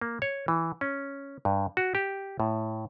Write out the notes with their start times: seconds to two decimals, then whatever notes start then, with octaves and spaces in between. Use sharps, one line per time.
0.02 A#3
0.22 C#5
0.48 E3
0.81 C#4
1.45 G2
1.77 F#4
1.95 G4
2.40 A2